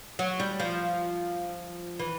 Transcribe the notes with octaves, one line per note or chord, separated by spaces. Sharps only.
F#3
G3
F3
E3